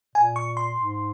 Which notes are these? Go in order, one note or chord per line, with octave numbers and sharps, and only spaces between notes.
A#2 G#5
C#6
C6
G#2